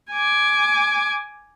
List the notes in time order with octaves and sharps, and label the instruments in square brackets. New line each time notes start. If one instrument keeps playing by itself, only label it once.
[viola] G#5 D6